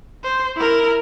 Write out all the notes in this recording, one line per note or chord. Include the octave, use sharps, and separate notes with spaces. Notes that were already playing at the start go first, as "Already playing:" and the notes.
C5
E4 A#4